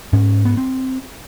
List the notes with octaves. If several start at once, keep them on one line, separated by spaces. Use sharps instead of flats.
G#2 C#4
B3
C4